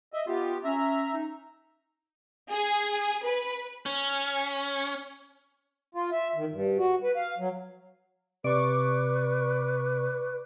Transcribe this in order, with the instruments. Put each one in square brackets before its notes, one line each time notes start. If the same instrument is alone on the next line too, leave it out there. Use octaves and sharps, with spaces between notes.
[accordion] D#5 E5
[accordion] B3 G4 [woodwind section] F4
[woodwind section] C#4 [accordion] E5 A#5
[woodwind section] D#4
[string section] G#4
B4
[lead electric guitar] C#4
[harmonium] F4
E5
D#3
G2
F#4
B4
F5
F#3
[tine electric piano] C3 [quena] B4 [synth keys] D5 C#6 D6